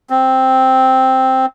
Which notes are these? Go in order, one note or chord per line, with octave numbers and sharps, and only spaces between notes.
C4